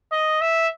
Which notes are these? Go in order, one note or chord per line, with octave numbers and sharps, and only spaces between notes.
D#5
E5